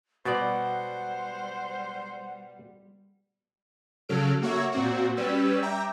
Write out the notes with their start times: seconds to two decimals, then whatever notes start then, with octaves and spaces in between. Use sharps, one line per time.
0.25 B2 G3 C5 D5 F#5
4.09 C#3 F#3 A4 F6 D7
4.42 A#3 F#4 C#5 E5
4.72 A#2 C4 F#4
5.17 G3 C#4 B4 E6
5.62 E5 G5 A#5 D6